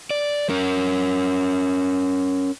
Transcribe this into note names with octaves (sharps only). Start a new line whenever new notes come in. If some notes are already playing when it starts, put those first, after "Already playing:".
D5
C#4 A#4